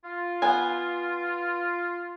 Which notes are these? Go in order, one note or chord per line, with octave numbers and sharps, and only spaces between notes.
F4
B3 G#5